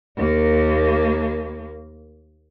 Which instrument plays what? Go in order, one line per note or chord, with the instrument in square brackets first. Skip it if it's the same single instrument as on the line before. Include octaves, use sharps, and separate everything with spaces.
[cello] D#2 A#3